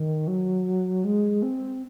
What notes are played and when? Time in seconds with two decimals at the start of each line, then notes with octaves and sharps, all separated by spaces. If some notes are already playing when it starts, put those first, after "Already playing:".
Already playing: D#3
0.28 F#3
1.04 G#3
1.43 C4